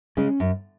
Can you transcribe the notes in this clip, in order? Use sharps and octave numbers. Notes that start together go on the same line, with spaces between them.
C#3 G#3 C#4
F#2